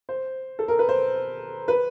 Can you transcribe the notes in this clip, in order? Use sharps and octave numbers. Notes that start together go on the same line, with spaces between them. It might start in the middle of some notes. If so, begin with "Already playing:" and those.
C5
A4
A#4
B4
C5
B4